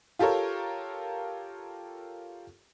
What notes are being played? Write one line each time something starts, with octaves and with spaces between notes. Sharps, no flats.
F4 G4 A4 A#4 C#5